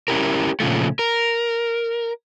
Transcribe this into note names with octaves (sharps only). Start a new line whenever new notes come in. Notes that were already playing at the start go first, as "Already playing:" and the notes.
C#4 E4 G4 A#4
A#2 C#3 F3 A3
A#4